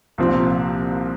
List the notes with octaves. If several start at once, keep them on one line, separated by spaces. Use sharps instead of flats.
C2 A#2 F3 C4